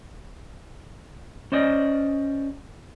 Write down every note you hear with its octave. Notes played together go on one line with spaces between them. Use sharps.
C#4 C5 D5 D#5